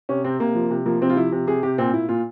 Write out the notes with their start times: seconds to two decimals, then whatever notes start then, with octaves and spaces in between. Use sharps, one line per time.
0.09 C3 C#4
0.24 C3 C4
0.40 C3 A#3
0.55 F3
0.70 C3
0.86 F3 A#3
1.01 C3 C4
1.09 F4
1.17 F3 E4
1.32 C3
1.47 C3 G#4
1.63 C3 G4
1.78 A#2 C4
1.94 A#2 E4
2.09 A#2 F4